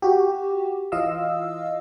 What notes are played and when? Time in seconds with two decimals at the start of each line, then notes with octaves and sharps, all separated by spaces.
0.02 F#4 G4
0.92 E3 F4 D#5 F5 E6